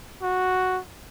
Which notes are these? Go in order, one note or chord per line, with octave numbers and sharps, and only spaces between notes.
F#4